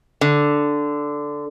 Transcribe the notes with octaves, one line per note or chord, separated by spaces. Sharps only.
D3